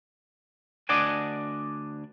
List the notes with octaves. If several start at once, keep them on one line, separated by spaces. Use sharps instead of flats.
D2 D4 D5 D#5 F#5 G#5